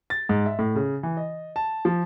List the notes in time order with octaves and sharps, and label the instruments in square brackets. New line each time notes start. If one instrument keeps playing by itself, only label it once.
[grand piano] A6
G#2
E5
A2
C#3
E3
D#5
A5
F3